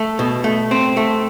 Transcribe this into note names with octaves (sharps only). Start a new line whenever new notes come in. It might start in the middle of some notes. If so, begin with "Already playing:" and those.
Already playing: A3
B2
A3
C4
A3